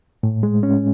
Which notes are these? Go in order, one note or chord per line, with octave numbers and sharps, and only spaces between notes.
A2
G#3
C#4